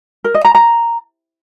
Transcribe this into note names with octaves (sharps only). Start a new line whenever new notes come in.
A#4
D#5
A#5
A#5